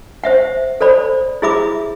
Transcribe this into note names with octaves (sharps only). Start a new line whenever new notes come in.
C5 E5 F#5
A4 C5 D5 B5
E4 G#4 E5 B5 D6